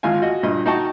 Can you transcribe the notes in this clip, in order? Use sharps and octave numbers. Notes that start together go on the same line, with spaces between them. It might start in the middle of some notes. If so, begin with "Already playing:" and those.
G#1 G#3 F4 F5 G#5
F#4 D#5
G2 A#2 D#5
D#4 F#4 D#5 G5 A5 C#6